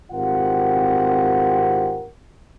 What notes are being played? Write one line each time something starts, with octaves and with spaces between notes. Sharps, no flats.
G#1 C4 F4 G4 A#4 F#5